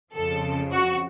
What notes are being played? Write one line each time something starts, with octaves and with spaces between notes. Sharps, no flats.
F2 C#3 F3 A4
F#4